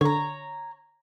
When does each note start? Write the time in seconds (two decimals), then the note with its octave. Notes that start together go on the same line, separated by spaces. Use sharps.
0.01 D3 C#5 A#5